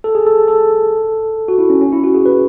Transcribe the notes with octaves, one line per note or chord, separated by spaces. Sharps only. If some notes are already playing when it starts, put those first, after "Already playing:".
A4
G#4
A4
A4
F#4
E4
C#4
C#4
E4
F#4
G#4
B4